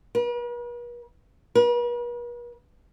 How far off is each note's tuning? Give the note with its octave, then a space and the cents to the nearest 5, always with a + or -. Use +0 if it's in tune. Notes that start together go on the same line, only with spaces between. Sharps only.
B4 -45
B4 -45